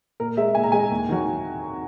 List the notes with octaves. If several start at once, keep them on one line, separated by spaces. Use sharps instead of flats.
A#2 A#4
G#3 E5
A#2 G#5
A#5
G#3 G#5
D#2
D#3 F#3